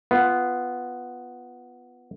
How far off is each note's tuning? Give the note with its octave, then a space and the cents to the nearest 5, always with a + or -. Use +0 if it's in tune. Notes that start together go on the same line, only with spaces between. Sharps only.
B3 +0 F4 -10